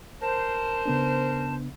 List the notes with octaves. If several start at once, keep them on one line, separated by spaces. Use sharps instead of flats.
A#4 C5 A5
C#3 B3 D4